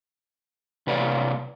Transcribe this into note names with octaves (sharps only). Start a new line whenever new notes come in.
C3 B4 C#5 D5 F5